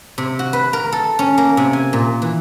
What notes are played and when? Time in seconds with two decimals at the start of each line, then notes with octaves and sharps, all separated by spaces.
0.18 C3
0.39 F#4
0.53 B4
0.73 A#4
0.92 A4
1.19 C#4
1.38 A#3
1.57 C3
1.73 G#5
1.93 A#2
2.22 E3